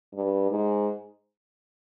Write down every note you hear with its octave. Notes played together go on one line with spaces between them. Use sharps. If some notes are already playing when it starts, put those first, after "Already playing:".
G2
G#2